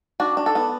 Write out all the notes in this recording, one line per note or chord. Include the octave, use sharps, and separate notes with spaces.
D4 F#4
D4
A4
B3